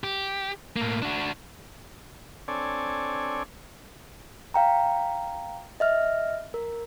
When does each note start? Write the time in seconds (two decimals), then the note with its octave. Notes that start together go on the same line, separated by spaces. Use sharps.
0.04 G4
0.76 A2 A#3
1.02 D4 F#4
2.48 C4 D4 A4 C#5 D5 G#5
4.54 F5 G5 A#5
5.80 D#5 E5 F6
6.54 A#4